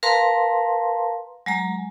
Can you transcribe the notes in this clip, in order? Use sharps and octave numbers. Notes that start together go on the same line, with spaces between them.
A#4 B4 F5 A5 A#5 C6
F#3 G#3 A#5